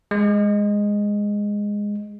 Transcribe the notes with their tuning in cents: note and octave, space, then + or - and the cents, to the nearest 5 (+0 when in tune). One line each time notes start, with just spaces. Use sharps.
G#3 -10